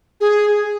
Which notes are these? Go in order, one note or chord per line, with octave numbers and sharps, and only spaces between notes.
G#4